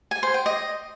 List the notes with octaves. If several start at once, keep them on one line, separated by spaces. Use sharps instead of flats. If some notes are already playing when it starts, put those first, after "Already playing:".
G#5
C5
G5
D#5